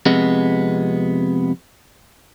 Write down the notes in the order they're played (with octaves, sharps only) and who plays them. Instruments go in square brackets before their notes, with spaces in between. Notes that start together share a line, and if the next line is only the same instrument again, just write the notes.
[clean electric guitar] F2 C3 G#3 B3